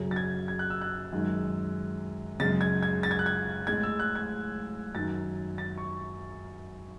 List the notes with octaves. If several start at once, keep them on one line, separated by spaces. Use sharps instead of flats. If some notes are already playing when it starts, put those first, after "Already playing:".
Already playing: F#2 C#3 F#3
A6
G#6
G#6
F#6
E6
F#6
F#2 D#3 G#3
F#2 C#3 G#3 A6
G#6
G#6
A6
G#6
F#6
G#6
A2 G#3 G#6
E6
F#6
G#6
F#2 D#3 F#3 A6
A6
C#6